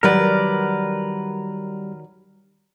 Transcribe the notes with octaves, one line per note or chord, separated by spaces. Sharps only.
D#3 F#3 G3 A#4 B4 D5